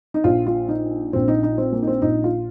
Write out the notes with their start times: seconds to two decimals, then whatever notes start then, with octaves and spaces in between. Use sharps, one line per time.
0.14 D#4
0.24 A#1 A#2 F4
0.47 F4
0.69 D#4
1.13 A#1 A#2 C4
1.28 D#4
1.43 D#4
1.58 C4
1.72 A#3
1.82 D#4
1.87 C4
2.02 A#1 A#2 D#4
2.24 F4